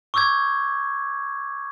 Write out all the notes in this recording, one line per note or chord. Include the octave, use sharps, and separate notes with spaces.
C#6 D6 E6 G6 G#6